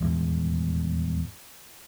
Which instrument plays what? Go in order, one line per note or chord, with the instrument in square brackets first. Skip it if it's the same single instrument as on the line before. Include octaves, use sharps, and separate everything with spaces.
[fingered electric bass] D#1 E2 G#2